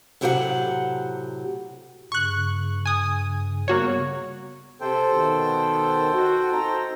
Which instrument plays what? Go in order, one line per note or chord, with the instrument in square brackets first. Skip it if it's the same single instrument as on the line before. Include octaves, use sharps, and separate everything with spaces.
[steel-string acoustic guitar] A2 C3 F#3 G4 A4 F#5
[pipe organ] G2 C#3 [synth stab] C#6 F#6
[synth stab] G#5 D#6
[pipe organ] C#3 G3 B3 [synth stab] A#3 F#4 C#5
[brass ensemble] C3 [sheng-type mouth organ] A4 C5 G5
[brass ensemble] B2 D#3
F#4
C4 D#4 A#5